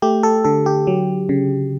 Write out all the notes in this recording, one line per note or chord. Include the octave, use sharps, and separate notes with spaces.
A3 G4
A4
D3 A4
G4
F#3
C#3